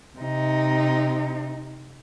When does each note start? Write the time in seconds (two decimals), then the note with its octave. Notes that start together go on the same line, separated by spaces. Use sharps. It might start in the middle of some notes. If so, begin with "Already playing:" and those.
0.19 C3 D#4